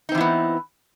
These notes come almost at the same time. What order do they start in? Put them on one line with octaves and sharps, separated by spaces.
D#4 C4 E3 E4 B3